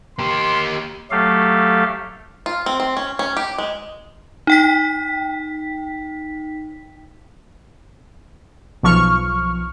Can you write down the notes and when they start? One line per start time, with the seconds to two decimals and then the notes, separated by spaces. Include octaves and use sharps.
0.19 A#3 G4 C6
1.11 F#3 A3 G4 A4 F5
2.46 F4
2.66 C4
2.80 C4
2.97 C#4
3.19 C#4
3.37 G4
3.58 G#3
4.47 D#4 G5 B6
8.83 B1 F3 C#6 F6